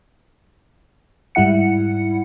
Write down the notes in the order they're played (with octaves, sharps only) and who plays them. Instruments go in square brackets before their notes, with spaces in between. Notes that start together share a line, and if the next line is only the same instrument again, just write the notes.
[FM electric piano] G#2 G3 E4 F#5 C#7